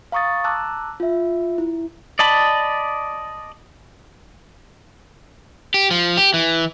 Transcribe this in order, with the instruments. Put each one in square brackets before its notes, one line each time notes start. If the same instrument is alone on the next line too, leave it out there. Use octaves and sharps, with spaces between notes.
[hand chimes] F5 A#5 C#6 D#6 A6
A5 A#5 D6 E6 F#6
F4 E5
E4
[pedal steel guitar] D5 D#5 A5 B5
[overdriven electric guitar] G4
F3
G4
E3